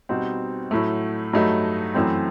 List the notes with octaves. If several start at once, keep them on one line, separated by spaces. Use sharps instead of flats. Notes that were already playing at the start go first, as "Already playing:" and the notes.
B2 G3 C4 D#4
A2 F#3 A3
G2 F#3 A3 D#4
F#2 E3 A3 C4